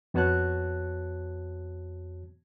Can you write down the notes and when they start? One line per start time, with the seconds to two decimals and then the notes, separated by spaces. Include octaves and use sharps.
0.14 F2 B3 F#4 C#5 A5 F#6